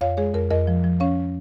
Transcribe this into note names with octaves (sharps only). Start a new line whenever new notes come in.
F2 C#5 F5
G#3 G#4 C#5
F2 A#4
F2 A#4 D#5
F3
F3
C#4 C#5 F5